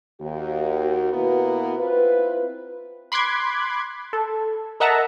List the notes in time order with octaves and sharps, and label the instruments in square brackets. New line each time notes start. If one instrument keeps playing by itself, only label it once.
[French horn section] D#2 F#4
B2 A#3 B3 E4 F#4 B4
C4 E4 F4 B4
[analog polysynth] B5 C6 D6 F#6 G#6
A4
A#4 D#5 E5 F#5 A5 A#5